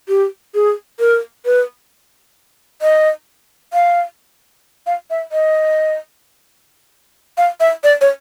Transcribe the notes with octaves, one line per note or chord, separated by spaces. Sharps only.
G4
G#4
A#4
B4
D#5
F5
F5
E5
D#5
F5
E5
D5
C#5